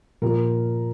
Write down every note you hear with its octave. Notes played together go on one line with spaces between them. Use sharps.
A#2 F3 A#4